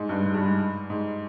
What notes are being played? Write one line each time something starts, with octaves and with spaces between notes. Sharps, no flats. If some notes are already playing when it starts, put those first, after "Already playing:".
Already playing: G#2
G2
G#2
G2
G#2
G#2